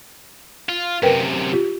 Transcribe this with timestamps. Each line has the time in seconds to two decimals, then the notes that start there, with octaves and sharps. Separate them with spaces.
0.69 F4
1.03 F#2 C3 A#4 B4 G5
1.53 F4 G4